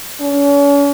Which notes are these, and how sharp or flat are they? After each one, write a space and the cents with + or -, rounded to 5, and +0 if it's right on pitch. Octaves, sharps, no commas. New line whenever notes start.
C#4 +40